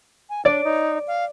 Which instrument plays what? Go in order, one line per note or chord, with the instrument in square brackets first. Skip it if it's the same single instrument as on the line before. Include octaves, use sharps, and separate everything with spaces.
[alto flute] G#5
[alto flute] D4 [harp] D5
[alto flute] D#4
F5